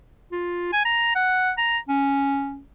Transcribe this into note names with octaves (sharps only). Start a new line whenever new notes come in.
F4
G#5
A#5
F#5
A#5
C#4